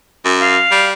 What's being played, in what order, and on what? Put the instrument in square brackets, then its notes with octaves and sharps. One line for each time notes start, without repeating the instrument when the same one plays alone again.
[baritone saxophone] F#2
[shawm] F5
[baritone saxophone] G3